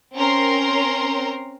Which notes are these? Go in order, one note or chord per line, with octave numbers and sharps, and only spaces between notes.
C4 C#4 A#4 A#5 C6